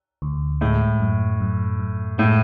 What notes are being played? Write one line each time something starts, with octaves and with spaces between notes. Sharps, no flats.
D2
A2 G#3
F#2
F#2
F#2
A2 G#3